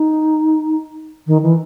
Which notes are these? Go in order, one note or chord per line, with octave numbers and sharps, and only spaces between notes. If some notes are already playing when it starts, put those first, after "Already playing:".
Already playing: D#4
D#3
E3